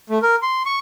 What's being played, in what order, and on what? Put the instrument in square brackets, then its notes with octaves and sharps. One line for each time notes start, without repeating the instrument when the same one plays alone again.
[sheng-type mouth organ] A3
A#4
C6
C#6